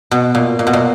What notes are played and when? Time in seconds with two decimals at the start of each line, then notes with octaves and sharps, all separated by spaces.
0.11 B2
0.35 A#2
0.59 A#2
0.67 B2
0.73 A#2